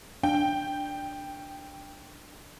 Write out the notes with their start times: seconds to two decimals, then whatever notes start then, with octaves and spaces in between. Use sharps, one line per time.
0.23 D4 G5